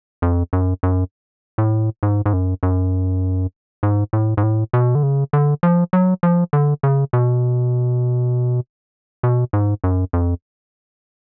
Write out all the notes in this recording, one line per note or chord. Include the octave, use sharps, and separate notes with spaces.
F2
F#2
F#2
A2
G#2
G#2
F#2
F#2
G#2
A2
G#2
A2
B2
D3
C#3
D3
F3
F#3
F3
D3
C#3
B2
B2
G#2
F#2
F2